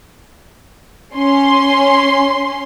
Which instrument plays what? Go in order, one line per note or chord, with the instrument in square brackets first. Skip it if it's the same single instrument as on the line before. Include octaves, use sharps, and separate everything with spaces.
[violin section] C#4 C6